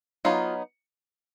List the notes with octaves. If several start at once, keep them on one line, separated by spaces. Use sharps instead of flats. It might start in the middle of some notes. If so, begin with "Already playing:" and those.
F#3 B3 D#4 F4